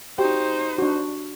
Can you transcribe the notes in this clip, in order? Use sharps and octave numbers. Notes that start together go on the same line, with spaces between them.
D#4 F#4 G4 C5 G5
D4 F#4